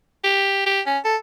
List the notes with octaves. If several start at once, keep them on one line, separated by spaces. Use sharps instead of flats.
G4
G4
C#4
A4